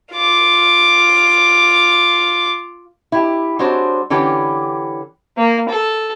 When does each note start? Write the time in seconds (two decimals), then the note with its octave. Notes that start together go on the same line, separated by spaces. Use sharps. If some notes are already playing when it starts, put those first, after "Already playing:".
0.13 F4 D6
3.12 E4 G4
3.59 G#3 C4 D4 F#4 C5 C#5
4.10 D3 E3 C#4 G4 G5
5.37 A#3
5.69 A4